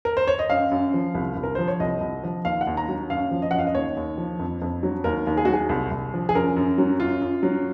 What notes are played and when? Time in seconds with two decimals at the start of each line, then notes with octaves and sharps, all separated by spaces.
0.05 A#4
0.17 C5
0.28 C#5
0.39 D#5
0.50 F#2 F5
0.71 F#2
0.94 F3
1.15 C2
1.36 C2
1.43 A#4
1.55 F3 C5
1.68 C#5
1.80 C2 D#5
2.01 C2
2.23 F3
2.45 D#2 F5
2.61 F#5
2.67 D#2
2.77 A#5
2.89 F#3
3.10 F#2 F5
3.31 F3
3.42 D#5
3.51 F#2 F#5
3.59 F5
3.67 D#5
3.75 D#2 C#5
3.97 D#2
4.18 F3
4.40 F2
4.62 F2
4.83 F#3
5.04 D#2 A#4
5.27 D#2
5.37 G#4
5.45 F#4
5.48 F#3
5.53 G#4
5.69 C2
5.91 C2
6.14 F3
6.29 G#4
6.34 F#2 A#4
6.57 F#2
6.78 F#3
6.99 F#2 F4
7.21 F#2
7.43 F#3